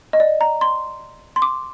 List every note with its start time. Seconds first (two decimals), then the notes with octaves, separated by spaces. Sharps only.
0.13 D#5
0.20 D5
0.41 A#5
0.61 C6
1.36 C6
1.42 D6